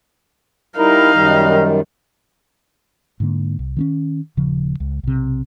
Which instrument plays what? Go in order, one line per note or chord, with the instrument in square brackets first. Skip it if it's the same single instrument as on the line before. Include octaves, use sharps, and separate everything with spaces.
[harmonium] G3 E4 A#4 [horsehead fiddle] D#4 F5
[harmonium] F#2 D#3 G3
[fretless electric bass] G#2 D3 A#3
C2
D#3 C4 C#4
D#1 C#3 F3
C#2
B1 C3